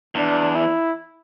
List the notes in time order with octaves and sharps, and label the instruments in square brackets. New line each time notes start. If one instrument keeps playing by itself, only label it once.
[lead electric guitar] E2 [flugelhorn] D4
[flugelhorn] E4